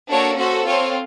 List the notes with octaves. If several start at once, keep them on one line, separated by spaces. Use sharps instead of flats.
A#3 D4 F#4 A4 C#5
C#4 F#4 A4 C5
C4 F4 A4 C#5